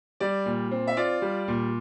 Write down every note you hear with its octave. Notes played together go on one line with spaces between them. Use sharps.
G3 D5
A#2
C4
E5
F4 D5
G3
A#2